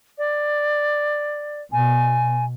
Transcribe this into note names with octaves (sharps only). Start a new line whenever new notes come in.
D5
B2 G#5